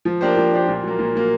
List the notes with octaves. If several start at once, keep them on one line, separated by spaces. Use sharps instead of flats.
F3
A#3 D4 G4 C5
F3
A#3 D4 G4 C5
A#2
F#3 A#3
A#2
F#3 A#3